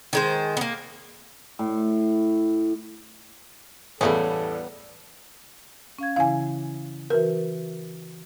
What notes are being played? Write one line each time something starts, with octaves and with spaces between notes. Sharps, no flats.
D#3 G#3 C5
A#3 B3
A2
E2 A2 C#3 E3 G3 B3 C#4 A4
C#4 F5 G#6
C#3 E3 E4 F5 G#5
E3 F#4 A#4 B4